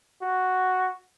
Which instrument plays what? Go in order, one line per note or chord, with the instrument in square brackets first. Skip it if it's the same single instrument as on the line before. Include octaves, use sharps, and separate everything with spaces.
[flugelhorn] F#4